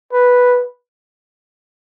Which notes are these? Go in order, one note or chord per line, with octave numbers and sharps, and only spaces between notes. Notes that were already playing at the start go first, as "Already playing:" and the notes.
B4